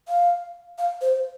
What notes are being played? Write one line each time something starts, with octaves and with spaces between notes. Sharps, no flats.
F5
F5
C5